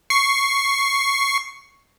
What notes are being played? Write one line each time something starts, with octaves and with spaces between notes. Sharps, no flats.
C#6 C7